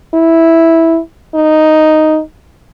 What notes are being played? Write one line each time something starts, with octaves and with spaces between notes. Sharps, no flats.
E4
D#4